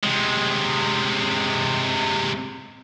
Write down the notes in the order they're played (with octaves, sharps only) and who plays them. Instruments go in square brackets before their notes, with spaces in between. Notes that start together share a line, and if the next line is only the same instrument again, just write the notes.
[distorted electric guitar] C3 G#3